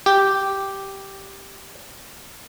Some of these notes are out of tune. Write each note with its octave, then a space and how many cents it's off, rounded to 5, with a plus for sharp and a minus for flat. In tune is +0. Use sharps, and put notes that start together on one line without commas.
G4 -5